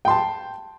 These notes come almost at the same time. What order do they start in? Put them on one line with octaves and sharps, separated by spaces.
G5 C6 A5